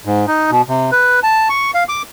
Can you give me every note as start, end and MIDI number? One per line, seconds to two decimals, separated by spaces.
0.05 0.26 44
0.27 0.51 63
0.51 0.62 47
0.68 0.91 48
0.92 1.20 71
1.23 1.48 81
1.49 1.71 85
1.74 1.84 77
1.89 2.02 86